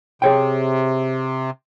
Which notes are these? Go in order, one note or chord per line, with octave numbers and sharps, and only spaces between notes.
C3 G#4 C#5 G5